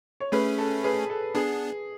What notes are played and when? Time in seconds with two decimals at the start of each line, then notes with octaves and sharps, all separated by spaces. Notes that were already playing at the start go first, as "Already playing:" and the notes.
0.20 C#5
0.32 A3 C#4 G#4 B4
0.58 A4
0.84 G#4 B4
1.10 A4
1.35 B3 D4 G#4